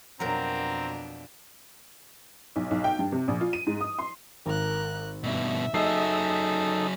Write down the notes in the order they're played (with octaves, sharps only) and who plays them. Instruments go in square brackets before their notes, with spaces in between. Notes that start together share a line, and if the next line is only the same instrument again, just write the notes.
[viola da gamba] F2 B2 D4 [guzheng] F#3 A#4 [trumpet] C4 [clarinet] A#5
[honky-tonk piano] B1
B1
G5
G2
C3
A#1
F4
D#7
G#2
D#6
C6
[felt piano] G#1 [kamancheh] A#4 F#6
[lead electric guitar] G2 B2 [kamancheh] E5
[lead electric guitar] F#3 G#4 [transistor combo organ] D#4 A4 [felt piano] D#5 E6 C7